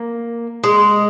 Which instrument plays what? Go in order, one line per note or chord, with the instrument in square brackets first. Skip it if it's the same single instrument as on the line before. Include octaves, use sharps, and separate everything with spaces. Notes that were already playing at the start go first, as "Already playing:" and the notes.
Already playing: [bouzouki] A#3
G#3